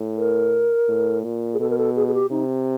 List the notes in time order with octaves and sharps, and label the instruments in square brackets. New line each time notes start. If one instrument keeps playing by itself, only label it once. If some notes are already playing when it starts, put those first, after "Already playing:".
Already playing: [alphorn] A2
[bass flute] A#4
[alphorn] A2
A#2
[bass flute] G#4
[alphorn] B2 [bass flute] A4
[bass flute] A#4
A4
G#4
G#4
G4
[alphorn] C3 [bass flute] D#4